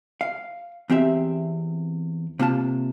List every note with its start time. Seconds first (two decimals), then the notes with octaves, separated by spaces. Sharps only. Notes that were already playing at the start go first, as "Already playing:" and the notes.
0.21 F5
0.90 E2 C4 G4 E5
2.39 C3 A#3 F4 A5